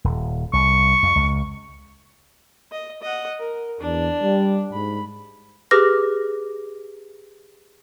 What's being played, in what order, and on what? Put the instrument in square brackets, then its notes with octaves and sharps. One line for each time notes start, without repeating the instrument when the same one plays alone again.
[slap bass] D#1
[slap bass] C2 [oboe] C#6
[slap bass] F2
C#2
[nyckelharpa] D#5
D#5 F#5
A#4
[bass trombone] E2 [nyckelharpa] D4 D5
[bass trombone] G3
[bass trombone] G#2 [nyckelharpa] B5
[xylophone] G4 G#4 B4 D6 F6 A#6